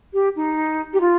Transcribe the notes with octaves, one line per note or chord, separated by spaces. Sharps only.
G4
D#4
G4
F4